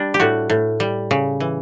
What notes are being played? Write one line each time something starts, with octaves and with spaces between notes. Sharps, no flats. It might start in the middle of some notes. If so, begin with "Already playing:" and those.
Already playing: G3 D4
G4
A2 F#4
A2
G3
C#3
E3